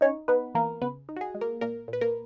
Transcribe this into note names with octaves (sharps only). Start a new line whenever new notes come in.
C#4 D#4 C#5
B3 D#4 B4
E3 A#3 A#4
C#3 B3 B4
D#4
F#4
G#4
G#3
A#3 A#4
A#2 A#3 A#4
A#2
B4
A#3 A#4